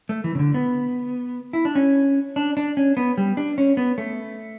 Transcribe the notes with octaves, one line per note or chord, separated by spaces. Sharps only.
A3
E3
C#3
D3
B3
E4
D4
C#4
D4
D4
C#4
B3
G3
D4
C#4
B3
A3